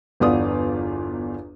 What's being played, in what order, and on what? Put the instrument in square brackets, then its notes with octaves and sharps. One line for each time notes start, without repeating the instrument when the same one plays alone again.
[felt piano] G1 E2 B3 F4 D5 D#6